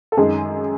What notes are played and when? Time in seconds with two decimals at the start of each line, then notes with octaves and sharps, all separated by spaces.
0.12 A4
0.17 F#2 D#3 G#3 G#4